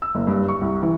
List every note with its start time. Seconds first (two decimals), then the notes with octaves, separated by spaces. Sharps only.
0.02 E6
0.15 F#1
0.27 G2
0.48 C#6
0.61 C2
0.82 E3